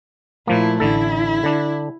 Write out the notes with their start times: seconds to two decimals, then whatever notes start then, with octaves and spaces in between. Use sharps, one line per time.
0.47 A#2 F3 A3 A#3 E4
0.80 A1 D3 E4 A4
1.43 D3 D4